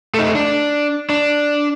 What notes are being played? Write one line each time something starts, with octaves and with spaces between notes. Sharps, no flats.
A3 D#4
D4
D4